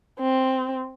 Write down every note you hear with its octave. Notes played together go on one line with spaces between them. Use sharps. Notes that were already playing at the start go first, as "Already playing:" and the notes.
C4